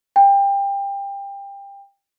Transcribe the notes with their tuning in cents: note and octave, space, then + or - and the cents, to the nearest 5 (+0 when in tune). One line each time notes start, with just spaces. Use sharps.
G5 +25